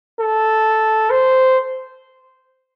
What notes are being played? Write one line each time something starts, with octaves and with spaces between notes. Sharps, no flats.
A4
C5